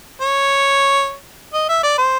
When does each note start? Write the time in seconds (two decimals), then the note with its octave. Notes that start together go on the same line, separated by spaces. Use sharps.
0.22 C#5
1.54 D#5
1.69 E5
1.83 D5
1.98 C5